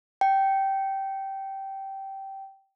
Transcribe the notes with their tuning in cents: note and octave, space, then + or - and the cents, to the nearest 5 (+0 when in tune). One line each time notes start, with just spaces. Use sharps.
G5 -15